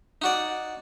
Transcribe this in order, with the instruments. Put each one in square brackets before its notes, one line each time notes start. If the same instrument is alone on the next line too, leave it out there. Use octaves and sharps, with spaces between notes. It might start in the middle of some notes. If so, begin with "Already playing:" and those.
[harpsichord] D#4 F#4 D5